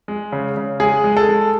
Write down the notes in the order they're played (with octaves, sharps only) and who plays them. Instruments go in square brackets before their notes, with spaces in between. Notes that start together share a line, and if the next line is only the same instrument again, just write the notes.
[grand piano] G#3
C#3
C#3
G#3 G#4
G#3
A4
G#3